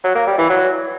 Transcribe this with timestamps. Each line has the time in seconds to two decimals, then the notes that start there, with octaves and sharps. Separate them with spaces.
0.03 F#3
0.15 A#3
0.26 G3
0.38 E3
0.49 F#3